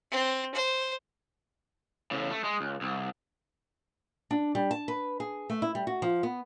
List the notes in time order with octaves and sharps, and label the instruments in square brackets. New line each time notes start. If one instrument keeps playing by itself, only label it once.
[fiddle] C4
C5
[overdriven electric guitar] A2 C#3
A3
G#3
C#2
C2
[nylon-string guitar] D4
G3
A5
B4
G#4
A3
E4
G3
F#4
F3
B3